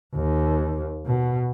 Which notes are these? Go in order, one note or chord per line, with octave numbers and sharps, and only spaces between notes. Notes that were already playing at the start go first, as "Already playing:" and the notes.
D#2
B2